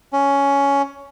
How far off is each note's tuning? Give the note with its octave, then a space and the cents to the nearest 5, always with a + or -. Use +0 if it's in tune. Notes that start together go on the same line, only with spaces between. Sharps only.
C#4 +10